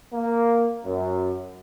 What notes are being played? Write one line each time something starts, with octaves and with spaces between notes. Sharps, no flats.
A#3
F#2